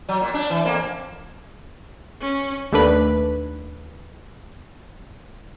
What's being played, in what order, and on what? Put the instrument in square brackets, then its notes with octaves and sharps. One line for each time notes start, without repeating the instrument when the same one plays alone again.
[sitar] F#3
A#2
D4
E3
F2 A#3
[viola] C#4
[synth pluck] D#2 A3 D4 B4